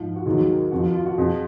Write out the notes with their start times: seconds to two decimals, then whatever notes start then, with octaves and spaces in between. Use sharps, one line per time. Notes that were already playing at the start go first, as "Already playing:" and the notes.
Already playing: G#2 F3
0.16 F#4
0.26 D#2 D#3 F#3 G#4
0.71 F2 F3 F#4
0.83 F4
0.95 F4
1.06 F#4
1.18 F2 F3 G#4